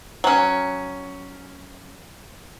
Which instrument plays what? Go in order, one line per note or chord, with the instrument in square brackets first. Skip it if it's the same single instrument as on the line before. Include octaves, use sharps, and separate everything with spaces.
[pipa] F#3 C#4